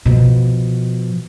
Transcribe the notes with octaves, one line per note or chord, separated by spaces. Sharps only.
B2 F3